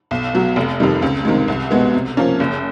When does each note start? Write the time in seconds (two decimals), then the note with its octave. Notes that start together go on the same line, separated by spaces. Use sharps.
0.11 B1
0.33 B2 F#3
0.56 F1
0.80 F2 C3 D#3 G3
1.02 C#2
1.25 C3 D#3 G#3
1.48 C2
1.71 B2 G#3 B3
1.94 C3
2.17 F3 A#3 C#4
2.40 F#1